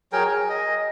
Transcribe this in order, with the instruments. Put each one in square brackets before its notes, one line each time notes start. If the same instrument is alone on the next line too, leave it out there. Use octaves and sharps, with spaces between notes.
[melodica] F#3 G#4 A#4 G5
G#4
D#5